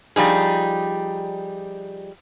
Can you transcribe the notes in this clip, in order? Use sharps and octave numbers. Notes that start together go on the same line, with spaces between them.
F3 G3 D#4 G#4